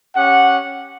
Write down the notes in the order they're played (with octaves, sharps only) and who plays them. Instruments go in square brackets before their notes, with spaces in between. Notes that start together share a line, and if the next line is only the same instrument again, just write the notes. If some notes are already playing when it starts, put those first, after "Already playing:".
[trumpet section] C#4 G4 F#5